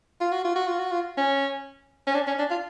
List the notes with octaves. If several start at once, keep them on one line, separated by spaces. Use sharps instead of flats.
F4
F#4
F4
F#4
F4
F#4
F4
C#4
C#4
D4
C#4
D4
F4